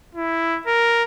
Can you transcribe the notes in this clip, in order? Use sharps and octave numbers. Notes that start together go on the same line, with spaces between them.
E4
A#4